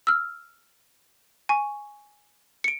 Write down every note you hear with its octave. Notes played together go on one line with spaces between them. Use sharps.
E6 F6
G#5 C#6
C#7 D7